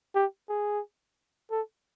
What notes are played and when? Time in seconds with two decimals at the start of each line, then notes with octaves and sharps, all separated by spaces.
0.15 G4
0.49 G#4
1.51 A4